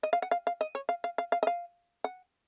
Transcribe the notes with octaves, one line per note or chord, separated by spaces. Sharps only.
D#5
F5
F#5
F5
F5
D#5
C#5
F5
F5
F5
F5
D#5
F5
F#5